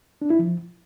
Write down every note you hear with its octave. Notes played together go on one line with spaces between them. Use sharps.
D4
E4
F3